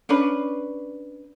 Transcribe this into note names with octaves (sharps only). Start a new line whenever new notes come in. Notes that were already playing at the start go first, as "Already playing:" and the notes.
C#4 D4 B4